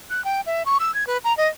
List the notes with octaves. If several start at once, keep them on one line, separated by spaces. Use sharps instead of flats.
F#6
G5
E5
C#6
E6
G#6
B4
A#5
D#5